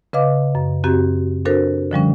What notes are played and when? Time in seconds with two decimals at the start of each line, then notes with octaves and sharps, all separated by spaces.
0.13 C#3 B4 D#5 F5 D6
0.55 F#2
0.84 F#2 C4 F#4 G4
1.45 D4 F#4 A4 A#4 C5
1.91 D3 F3 G3 C#4